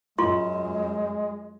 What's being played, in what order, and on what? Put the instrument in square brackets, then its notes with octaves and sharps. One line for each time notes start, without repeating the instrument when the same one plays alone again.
[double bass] F#2 [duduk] G#3 [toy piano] F4 C6 C#6